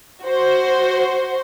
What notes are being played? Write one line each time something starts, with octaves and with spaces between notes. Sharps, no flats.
F#4 C5